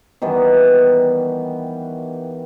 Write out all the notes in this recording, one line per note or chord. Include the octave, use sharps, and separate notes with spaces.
D#3 E3 G3 B3